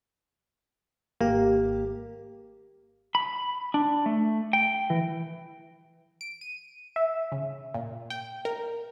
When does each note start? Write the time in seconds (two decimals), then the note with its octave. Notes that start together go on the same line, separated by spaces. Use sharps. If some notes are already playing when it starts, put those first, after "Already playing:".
1.21 G#1 A#3 G4
3.15 B5
3.74 D4
4.06 A3
4.53 G5
4.90 E3
6.21 D7
6.41 D#7
6.96 E5
7.32 C#3
7.74 A#2
8.10 G5
8.45 A#4